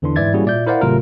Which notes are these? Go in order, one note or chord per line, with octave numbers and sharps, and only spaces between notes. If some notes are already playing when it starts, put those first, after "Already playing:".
E2 D3 E3 D4 C6
G#2 E3 D5 E5 G#6 A6
G3 A#3 C#4 E4 F#4 G#4
A#2 D5 E5 G6
E4 A#4 C5 D5 F5 F#5
G#1 C3 F#3 A3 F4 A#4